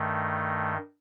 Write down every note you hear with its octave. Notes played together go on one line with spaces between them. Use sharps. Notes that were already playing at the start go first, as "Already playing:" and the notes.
Already playing: G2 D#3 A3